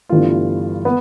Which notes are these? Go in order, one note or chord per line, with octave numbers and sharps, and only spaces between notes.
G1 G2 E3 A3 F4
B3